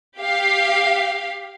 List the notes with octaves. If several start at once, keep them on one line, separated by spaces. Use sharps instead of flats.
G4 F5